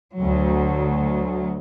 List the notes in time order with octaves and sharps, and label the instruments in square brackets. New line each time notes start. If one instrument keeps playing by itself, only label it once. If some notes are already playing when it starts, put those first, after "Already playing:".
[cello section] D2 F#3